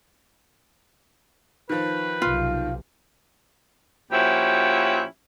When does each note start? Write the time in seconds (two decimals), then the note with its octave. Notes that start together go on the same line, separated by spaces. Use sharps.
1.69 D#3 F3 B4
2.22 B1 C3 F4
4.11 A#2 F3 C#4 E4 F#4 G4